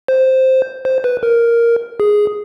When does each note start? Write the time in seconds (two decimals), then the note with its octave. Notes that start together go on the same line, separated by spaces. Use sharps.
0.08 C5
0.85 C5
1.04 B4
1.23 A#4
2.00 G#4